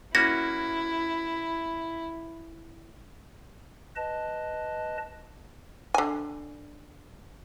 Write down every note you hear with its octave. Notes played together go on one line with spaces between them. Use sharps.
A#3 C#4 E4 F#4 A#6
B4 D#5 A5
D3 G#5